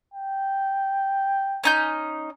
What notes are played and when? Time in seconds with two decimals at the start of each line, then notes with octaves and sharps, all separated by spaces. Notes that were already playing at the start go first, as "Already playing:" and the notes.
0.14 G5
1.64 C#4 D#4 G6